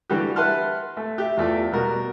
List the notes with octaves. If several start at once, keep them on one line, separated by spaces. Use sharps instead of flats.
D3 E3 G3 F#4 G4
B4 E5 F#5 A5 C6 F6
A3
G4 E5
E2 A3 F4 D5
B2 G3 F#4 A#4